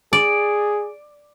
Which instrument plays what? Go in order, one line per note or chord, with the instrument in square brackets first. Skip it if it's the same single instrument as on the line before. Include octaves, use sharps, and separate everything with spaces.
[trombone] G#4 [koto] D5